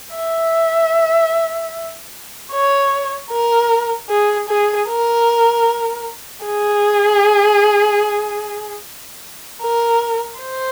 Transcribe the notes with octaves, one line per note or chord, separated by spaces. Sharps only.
E5
C#5
A#4
G#4
G#4
A#4
G#4
A#4
C5